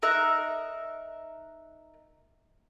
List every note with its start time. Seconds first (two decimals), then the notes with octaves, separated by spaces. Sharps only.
0.02 D#4 A#4 E5 F#6